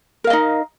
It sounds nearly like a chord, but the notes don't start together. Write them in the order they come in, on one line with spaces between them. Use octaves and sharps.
A#4 F5 D#5 D#4